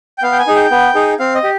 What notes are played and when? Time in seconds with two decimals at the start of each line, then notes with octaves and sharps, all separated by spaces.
0.18 G5
0.23 B3 F5
0.32 G5
0.39 G#5
0.47 D#4 G#4
0.55 G5
0.71 B3
0.95 D#4 G#4
1.19 C4 F5
1.35 D#5
1.44 G4